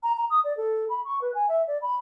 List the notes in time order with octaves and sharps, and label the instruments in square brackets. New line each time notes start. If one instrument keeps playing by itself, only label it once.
[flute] A#5
A#5
D#6
D5
A4
B5
C#6
B4
G#5
E5
D5
B5